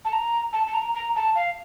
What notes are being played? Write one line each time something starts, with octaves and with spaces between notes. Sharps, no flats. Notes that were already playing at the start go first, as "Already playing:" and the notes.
A5
A#5
A5
A5
A#5
A#5
A5
F5